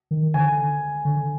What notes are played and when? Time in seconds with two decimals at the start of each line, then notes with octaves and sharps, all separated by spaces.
0.11 D#3
0.34 D3 G#5
1.05 D3